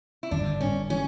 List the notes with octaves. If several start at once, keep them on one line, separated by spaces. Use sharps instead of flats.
E4
G1 D4
G2 C#4
E3 C#4